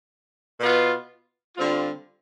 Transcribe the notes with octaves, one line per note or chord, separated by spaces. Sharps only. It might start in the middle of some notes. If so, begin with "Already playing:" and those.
B2 B3 F4
D3 G3 C4 F4